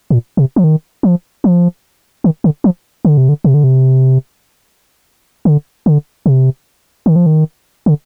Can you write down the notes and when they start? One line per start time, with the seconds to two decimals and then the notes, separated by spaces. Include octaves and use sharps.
0.10 A#2
0.37 C3
0.56 F3
0.64 D#3
1.03 F3
1.44 F3
2.24 D#3
2.44 D3
2.64 F3
3.05 D3
3.17 C3
3.29 D3
3.44 C3
3.54 D3
3.64 C3
5.45 D3
5.86 D3
6.26 C3
7.06 D#3
7.16 F3
7.26 D#3
7.86 D3